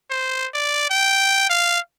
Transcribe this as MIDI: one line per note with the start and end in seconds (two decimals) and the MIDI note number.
0.10 0.47 72
0.54 0.86 74
0.90 1.47 79
1.49 1.79 77